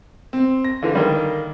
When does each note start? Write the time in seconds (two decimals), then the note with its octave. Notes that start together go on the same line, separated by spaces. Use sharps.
0.33 C4
0.64 A#6
0.83 D3 E3 F4
0.95 D3 D#3 G3 A#3